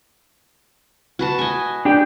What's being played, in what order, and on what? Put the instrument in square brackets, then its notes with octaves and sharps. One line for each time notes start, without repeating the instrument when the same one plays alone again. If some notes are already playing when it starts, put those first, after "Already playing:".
[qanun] F#4 B4 A5
D#5 G#5
[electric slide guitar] D4 G4 G5